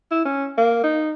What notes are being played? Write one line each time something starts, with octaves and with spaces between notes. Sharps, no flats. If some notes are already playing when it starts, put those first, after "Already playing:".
E4
C#4
A#3
D#4